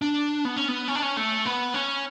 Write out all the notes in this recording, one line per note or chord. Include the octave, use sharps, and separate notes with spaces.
D4
B3
C#4
B3
C#4
D4
C#4
A3
B3
C#4